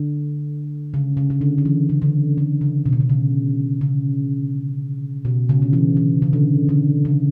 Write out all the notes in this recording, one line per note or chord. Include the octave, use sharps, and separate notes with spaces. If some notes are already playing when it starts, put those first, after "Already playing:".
Already playing: D3
C#3
C#3
C#3
D3
D3
E3
C#3
D3
D3
C#3
B2
C#3
B2
C#3
C#3
B2
C#3
D3
E3
E3
C#3
D3
D3
C#3